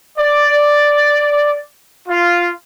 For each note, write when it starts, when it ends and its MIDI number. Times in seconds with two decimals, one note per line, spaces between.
0.18 1.60 74
2.08 2.49 65